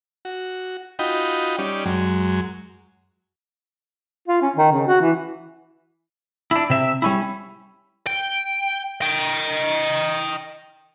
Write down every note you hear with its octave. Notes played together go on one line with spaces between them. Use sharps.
F#4
D#4 F4 F#4 D#5 G5 B5
G3 C#4 D#4 G4 D5
F#2 F#3 G#3
F4
C#4
D#3
C#3
F#4
E3
D4 E4
C3 E5
G3 C#4 E4
G5
D#5 G5